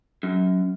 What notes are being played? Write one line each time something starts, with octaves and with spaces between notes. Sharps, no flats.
F#2